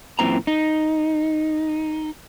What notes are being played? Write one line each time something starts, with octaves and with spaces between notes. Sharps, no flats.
F#2 A#2 E3 C4 A#5
D#4